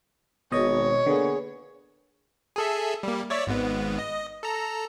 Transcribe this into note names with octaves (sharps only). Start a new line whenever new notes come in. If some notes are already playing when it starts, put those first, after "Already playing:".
G#1 B2 C#5 D#5
D3 A#3 B3 G#4
G#4 A4 E5
G3 A#3
C#5 D5 E5
G#1 G#2 B3
D#5
A4 A#5